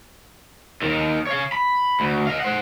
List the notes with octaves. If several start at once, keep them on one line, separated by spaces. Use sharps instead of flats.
D#2 D#3
C#5 F5
B5
D2
D#5 F5
C5 F#5